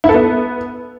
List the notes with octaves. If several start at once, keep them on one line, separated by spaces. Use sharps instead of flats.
E4
A4
B3